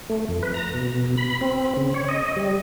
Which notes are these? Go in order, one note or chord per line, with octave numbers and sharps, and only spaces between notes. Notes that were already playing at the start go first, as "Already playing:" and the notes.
A3
F2
B4
A#5
B2
B5
C4
C#3
C#5
D#5
G3